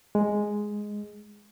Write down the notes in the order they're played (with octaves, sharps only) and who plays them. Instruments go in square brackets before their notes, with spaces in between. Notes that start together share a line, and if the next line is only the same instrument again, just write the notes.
[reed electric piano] G#3